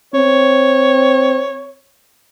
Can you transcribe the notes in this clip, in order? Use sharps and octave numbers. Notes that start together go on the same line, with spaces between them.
C4 C#5